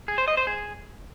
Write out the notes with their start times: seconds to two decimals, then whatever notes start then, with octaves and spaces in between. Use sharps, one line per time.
0.08 G#4
0.18 C5
0.28 D#5
0.37 C5
0.47 G#4